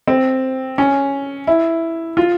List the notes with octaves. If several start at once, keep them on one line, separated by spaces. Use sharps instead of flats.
C4
C#4
E4
F4